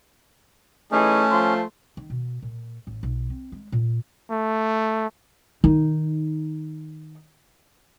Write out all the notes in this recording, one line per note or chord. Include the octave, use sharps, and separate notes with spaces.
E3 A3 C#4 D#4 G#4
F3 C6
D#3
B2
A#2
A1
B1
C4
G#3
A#2
A3
D#3 D#4